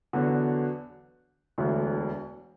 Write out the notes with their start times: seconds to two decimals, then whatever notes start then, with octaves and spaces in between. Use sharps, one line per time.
0.13 E2 D3 F#3 B3 F#4
1.58 E1 D2 D3